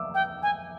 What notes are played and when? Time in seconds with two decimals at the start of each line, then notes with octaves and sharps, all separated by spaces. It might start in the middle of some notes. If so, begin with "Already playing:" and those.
Already playing: D6 E6
0.14 G5
0.43 G#5